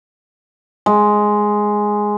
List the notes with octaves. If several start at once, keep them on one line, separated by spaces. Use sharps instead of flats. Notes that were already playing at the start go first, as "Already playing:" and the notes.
G#3